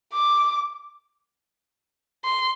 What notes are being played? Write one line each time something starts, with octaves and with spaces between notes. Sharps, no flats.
D6
C6